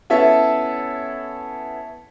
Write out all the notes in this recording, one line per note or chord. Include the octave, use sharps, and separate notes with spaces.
B3 C#4 E4 A4 C#5 E5